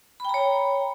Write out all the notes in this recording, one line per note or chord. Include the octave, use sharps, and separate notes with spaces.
C#5 G5 A#5 B5